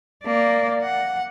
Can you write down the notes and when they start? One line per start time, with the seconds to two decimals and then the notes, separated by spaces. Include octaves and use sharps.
0.24 A#3 D5
0.83 F#5